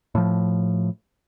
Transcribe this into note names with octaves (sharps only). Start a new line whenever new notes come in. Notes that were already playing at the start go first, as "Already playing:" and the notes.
A2 F3